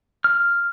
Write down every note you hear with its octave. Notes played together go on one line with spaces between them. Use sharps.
F6